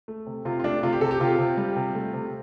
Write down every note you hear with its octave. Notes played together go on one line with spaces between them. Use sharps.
A3
C3
C3 F4
F4
A3 D4
C3 F4
G4
C3 A4
G4
C3 F4
C3
G3
C3
A3
C3